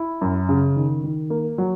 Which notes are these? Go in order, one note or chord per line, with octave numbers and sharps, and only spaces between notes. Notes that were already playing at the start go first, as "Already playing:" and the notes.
Already playing: E4
F#2
C#3
D#3
D#3
A#3
F#3